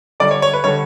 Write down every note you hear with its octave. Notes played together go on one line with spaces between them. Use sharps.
D3 G3 D5
C#5
C#5
B4
D3 G3 C#5